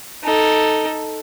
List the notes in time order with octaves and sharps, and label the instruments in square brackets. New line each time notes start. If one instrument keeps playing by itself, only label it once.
[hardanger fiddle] D#4 A4